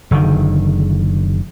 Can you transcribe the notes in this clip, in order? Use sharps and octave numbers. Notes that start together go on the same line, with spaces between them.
F#1 D3 D#3